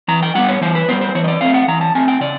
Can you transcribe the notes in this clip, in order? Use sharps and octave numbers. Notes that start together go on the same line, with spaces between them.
E3 A#5
G5
G3 B3 F#5
C#5
E3 C5
B4
G3 B3 C5
C5
E3 C#5
D#5
D5
A3 C4 F5
F#5
E3 A#5
A5
A3 C4 G#5
G5
C#3 D5